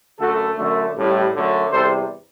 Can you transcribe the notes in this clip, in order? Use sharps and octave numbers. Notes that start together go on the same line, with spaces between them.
F#2 D3 A3 F#4 A4
F#2 D3 A3
A1 A2 G3
F#2 D3 F#3 A3
E2 C3 G3 A4 C5